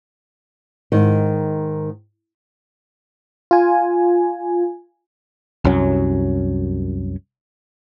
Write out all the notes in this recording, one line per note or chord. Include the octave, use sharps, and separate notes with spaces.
G#2 D#3
F4 G#5
C2 F#2 F#3 C#4